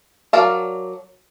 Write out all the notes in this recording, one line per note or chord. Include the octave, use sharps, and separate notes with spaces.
F#3 A#4 D5 F5 A5